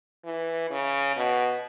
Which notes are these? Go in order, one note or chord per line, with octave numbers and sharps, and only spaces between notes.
E3
C#3
B2